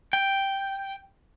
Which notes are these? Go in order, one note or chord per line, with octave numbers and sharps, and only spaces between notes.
G5